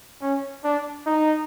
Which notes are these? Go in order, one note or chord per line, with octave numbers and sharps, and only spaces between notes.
C#4
D4
D#4